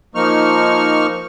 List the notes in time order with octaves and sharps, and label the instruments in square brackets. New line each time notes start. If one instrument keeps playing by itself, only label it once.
[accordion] F3 A#3 D#4 C#6 F6